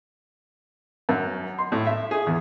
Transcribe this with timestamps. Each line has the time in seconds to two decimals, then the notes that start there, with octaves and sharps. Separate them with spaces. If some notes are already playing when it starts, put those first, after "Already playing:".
1.09 F#2
1.58 C6
1.72 A2
1.87 E5
2.11 G#4
2.27 E2